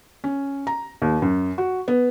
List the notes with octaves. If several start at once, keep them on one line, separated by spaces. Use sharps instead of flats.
C#4
A#5
D#2
F#2
F#4
B3